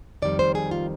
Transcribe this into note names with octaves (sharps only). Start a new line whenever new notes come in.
F2 D#3 G3 D5
C5
G#4
F4